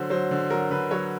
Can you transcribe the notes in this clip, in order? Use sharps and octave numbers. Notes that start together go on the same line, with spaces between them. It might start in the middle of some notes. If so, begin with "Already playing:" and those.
Already playing: D3 F#3 C5
F#3 C5
D3
F#3 A#4
D3 B4
F#3 C#5